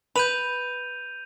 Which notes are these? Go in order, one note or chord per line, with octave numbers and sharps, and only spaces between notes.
B4 G6 D#7 F7